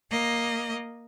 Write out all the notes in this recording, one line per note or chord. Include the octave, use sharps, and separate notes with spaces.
A#3 D#5